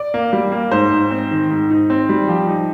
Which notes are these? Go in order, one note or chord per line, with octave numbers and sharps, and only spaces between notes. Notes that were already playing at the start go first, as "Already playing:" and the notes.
Already playing: D5
A#3
G3
A#3
G#2 C5
G#2
C4
D#3
G#2
D#4
C4
G3
F3 G4
D#4